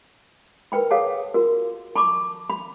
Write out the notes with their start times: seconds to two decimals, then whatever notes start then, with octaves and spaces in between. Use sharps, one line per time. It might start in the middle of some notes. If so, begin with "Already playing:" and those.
0.72 A#4 B4 G5 B5
0.91 G#4 A4 C#5 F5 F#5 A5
1.34 F4 F#4 A#4
1.96 A5 B5 C#6 D6
2.50 B5